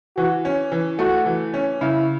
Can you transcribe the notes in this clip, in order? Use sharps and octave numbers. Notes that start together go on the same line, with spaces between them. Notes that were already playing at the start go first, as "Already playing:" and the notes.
E3 F#4
C#4
E3
A3 F#4
E3
C#4
C#3 E4